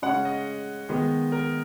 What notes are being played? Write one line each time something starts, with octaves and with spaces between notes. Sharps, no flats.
C#3 G#3 C#4 F#5
D#5
D#3 G#3 B3
A#4